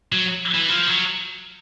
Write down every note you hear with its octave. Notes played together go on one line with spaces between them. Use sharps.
F#3
E3
F3
F#3